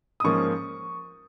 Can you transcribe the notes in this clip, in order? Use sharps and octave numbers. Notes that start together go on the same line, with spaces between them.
D#6
G#2 F3 A#3 C#4 C#6